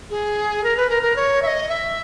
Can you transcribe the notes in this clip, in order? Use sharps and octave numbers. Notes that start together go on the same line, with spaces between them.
G#4
A#4
B4
A#4
A#4
C#5
E5
D#5
E5